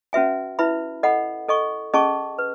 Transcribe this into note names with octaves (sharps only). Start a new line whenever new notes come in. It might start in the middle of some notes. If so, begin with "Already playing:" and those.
C#4 F#4 B4 E5 G#5
E4 B4 E5 B5
A4 D#5 F#5 B5
A4 D#5 G#5 C#6
C#4 G#4 D#5 A5 C#6
B4